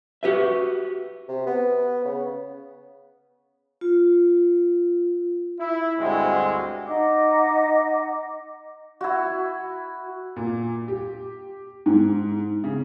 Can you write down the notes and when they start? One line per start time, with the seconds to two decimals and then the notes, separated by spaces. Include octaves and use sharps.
0.23 F#4 G4 B4 E5
1.28 C3
1.47 B3
2.05 C#3
3.81 F4
5.60 E4
5.99 D2 G2 G#3 C4 F#4
6.87 D#4 D#5 F#5 D6
9.01 E4 F#4
10.36 A#2
10.88 G4
11.86 G#2
12.64 C#3